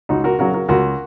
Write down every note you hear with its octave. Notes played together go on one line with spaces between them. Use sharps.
C#2 D#4 F#4
F#4 A#4
C#3 F#3 F#4 A#4
F#4 A#4
C#2 F#4 A#4